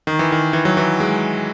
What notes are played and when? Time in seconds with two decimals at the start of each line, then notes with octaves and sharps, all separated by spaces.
0.07 D#3
0.19 E3
0.32 D#3
0.53 E3
0.65 F#3
0.77 E3
1.00 G#3